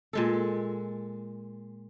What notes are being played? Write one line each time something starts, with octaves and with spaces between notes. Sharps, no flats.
A#2 G#3 A4